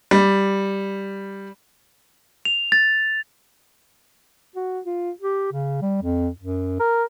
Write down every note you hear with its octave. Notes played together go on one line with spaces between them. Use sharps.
G3
F7
A6
F#4
F4
G4
C#3
G3
F2
F#2
A#4